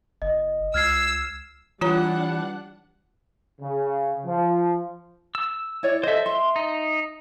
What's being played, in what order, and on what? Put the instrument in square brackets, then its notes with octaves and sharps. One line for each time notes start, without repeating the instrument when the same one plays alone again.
[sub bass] F#1 [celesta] D#5
[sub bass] C#2 [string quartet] E6 [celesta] F6 G#6 C7
[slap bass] E3 [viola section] G3 D4 F#5 [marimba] F4 C#5 A#5
[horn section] C#3
F3
[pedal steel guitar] E6
[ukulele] E4 C#5 D5
[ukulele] A4 D#5 [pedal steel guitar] C5 E5
[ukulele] E5 [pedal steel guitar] C6
[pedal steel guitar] D#4